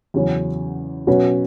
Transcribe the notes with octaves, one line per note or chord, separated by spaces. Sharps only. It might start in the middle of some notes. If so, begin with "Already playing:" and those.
E2 C#3 F#3 C#4
B2 F#3 C#4 F#4 B4